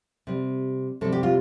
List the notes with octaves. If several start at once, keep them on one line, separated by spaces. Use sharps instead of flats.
C3 G3
C3 G3 A4
G4
F4